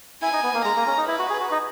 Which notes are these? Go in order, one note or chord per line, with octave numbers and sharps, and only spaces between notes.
E4 G#5
D#4
B3
A#3
G#3 A#5
A#3
C#4
D#4
E4 B4
F#4
G#4
F#4
D#4